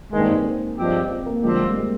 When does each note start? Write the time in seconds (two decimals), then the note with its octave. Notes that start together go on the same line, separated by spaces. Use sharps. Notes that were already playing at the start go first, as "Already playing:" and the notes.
0.13 G2 D#3 G#3 A#3
0.20 C4
0.29 D#4
0.44 C4
0.78 G2 F3 G#3 C4 G4
1.10 C4
1.26 A#3
1.43 D3 F3 G#3 C4 G4
1.51 G3
1.59 G#3
1.67 A#3
1.76 G#3